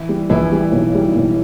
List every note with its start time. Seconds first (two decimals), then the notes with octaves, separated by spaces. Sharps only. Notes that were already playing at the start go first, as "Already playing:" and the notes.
Already playing: E3 E4
0.09 G3
0.30 A#1 E3 E4
0.52 G3
0.72 B1
0.95 G3
1.15 B1